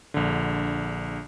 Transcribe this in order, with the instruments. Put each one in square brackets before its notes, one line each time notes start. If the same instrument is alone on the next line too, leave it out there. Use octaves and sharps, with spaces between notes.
[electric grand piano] A#1 D3